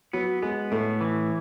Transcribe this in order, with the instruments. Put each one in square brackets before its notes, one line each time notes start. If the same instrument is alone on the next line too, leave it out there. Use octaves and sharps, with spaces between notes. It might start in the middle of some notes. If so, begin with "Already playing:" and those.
[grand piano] F#3 [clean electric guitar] B3
[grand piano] G#3 [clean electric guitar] B3
[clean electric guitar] A2 [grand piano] A3
[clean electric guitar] E3